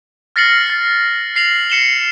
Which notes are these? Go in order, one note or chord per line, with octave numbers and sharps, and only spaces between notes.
F6 A6 A#6 C7 C#7 F#7
A6 C7
A#6 C7 F7 F#7
A#6 C7 C#7 E7 F#7 G7